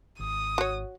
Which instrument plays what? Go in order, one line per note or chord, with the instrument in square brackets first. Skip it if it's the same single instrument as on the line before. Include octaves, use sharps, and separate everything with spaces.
[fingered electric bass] G#1 [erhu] D#6
[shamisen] F#4 C#5